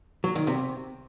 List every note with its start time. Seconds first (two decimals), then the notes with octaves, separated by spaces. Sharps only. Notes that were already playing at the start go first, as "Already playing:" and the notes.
0.24 F#3
0.36 D#3
0.47 C3